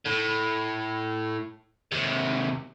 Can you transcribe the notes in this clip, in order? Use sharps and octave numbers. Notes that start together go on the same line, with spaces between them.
A2
D#2 C3